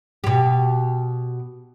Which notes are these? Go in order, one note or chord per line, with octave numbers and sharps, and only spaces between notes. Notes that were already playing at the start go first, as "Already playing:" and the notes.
B2 G4